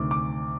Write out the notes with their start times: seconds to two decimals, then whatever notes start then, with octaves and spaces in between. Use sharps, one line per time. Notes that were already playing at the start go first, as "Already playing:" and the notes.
Already playing: D2 C3 D#3 D6
0.11 D6